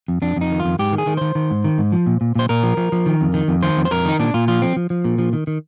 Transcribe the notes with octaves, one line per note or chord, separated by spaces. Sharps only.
F2
F2 D4
F2 D#4
D#3
F4
F2
G#2 G4
D#3
G#4
D#3
D#3 C5
D#3
G#2
D#3
G#2
F3
A#2
A#2
A#2 C5
A#2 A#4
F3
F3
F3
D#3
F2
D#3
F2
D#3 C5
F2
C5
F2 A#4
D#3 D#4
A#2 D4
A#2 F4
F3 F4
F3 C4
F3
F3
A#2
F3
D#3
D#3